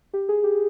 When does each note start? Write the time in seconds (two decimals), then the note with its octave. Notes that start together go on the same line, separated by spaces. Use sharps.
0.13 G4
0.29 G#4
0.44 G4